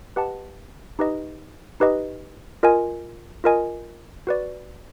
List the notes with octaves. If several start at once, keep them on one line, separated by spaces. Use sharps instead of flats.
G4 B4 D#5 F#5 A5
D#4 G4 B4 D#5
D#4 G4 B4 D#5
F4 A#4 D#5 G#5
F4 A#4 D#5 G#5
F#4 B4 D5